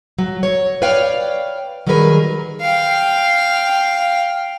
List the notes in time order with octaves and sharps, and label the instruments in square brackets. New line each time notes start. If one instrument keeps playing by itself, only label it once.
[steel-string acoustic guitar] F#3
C#5
B4 C#5 D5 F5 G5
D#3 F#3 G3 G#4 A#4 B4
[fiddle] F5 G5